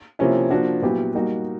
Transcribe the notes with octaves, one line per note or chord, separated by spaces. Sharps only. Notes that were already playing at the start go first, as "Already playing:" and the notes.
C3 F3 A#3 C#4 E4
F3 A#3 D4 F#4
A#2 F#3 B3 E4 G4
G3 A#3 D#4 F#4